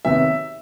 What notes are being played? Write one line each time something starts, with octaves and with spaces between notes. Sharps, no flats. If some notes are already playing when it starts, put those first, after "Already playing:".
C3 D#3 F#3 B3 E5